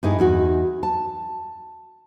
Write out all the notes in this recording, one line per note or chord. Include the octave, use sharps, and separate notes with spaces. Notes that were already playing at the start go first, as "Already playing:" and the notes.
G2 D#4 E4 G#4
E2 D#4 F#4
A5